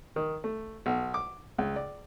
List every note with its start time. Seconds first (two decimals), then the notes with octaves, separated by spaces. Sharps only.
0.16 D#3
0.44 A3
0.86 B1
1.14 D6
1.58 C#2
1.76 D5